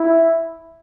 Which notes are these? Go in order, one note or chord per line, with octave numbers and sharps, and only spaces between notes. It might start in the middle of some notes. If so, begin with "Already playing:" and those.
Already playing: E4